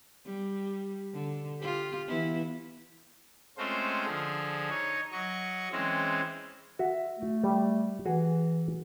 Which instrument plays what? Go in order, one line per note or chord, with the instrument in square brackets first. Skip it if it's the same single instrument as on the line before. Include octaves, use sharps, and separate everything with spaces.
[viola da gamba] G3
D3
F4 G4
E3 B3 E4
[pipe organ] G#3 A3 C4 C#4 F4 C5
D3 F3 G#4
D#4 C#5
F#3 D#5 C#6
E3 G#3 C4 C#4
[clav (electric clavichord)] F#4 [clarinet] E5
[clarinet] A3
[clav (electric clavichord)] G3
[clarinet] E3 [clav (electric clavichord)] F#4 G#4